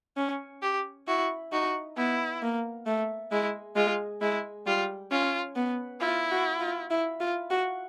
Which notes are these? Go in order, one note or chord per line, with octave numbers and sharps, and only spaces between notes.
C#4
G4
E4 F#4
D#4 F#4
B3 E4
A#3
A3
G#3 E4
G#3 F4
G#3 E4
G3 F4
C#4 F4
B3
E4 F4
F#4
F4
E4
F4
F#4